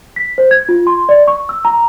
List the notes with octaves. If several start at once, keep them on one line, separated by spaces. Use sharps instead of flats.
B6
C5
G#6
F4
C6
D5
C#6
E6
A#5